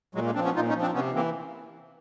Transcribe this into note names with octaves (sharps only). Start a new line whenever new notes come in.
A#2 F#3 G#3
G#3 A#3
F3 C4 D4
B3 C#4
A#2 D#4 F4
C#4 D#4
F3
C4 D4
C3 B3 C#4
E3 A#3 C4